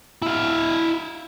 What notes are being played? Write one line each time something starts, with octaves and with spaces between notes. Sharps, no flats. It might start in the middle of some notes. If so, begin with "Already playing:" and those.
E4 F5